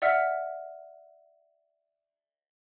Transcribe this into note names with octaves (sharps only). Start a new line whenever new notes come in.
D5 E5 F#5 E6 F6 B6